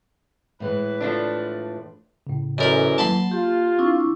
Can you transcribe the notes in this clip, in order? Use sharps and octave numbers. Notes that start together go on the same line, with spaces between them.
A2 E3 G#3 B4
F3 A3 D4
A2 C#3
F#2 E3 A4 A#4 D5 D#5 B5
F#3 A#3 A5 B5 C6
F4 G4
C4 D4 E4 C#6